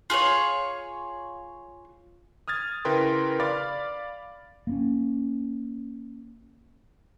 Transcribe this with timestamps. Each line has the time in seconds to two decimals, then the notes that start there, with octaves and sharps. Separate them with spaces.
0.10 F4 G#4 A4 C#5
2.48 D#6 F6 G#6 A6
2.85 C#3 E4 A#4 B4 G5 C6
3.40 D5 F5 B5 D6 F6 A6
4.67 A#3 B3 C#4